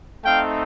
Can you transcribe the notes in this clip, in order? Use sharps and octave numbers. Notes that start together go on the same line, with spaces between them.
A3 C4 D#4 F5 G5